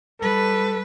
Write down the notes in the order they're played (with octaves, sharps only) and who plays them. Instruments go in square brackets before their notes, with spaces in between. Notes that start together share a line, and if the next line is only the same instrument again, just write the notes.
[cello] G3 B4 [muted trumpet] A4